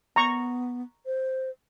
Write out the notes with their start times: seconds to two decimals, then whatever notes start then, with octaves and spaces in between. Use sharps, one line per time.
0.16 B3 A#5 C#6
1.06 C5